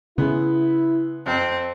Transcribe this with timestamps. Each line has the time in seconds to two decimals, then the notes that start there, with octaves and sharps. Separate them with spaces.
0.18 C#3 G#3 B3 C#4 E4
1.26 F2 C4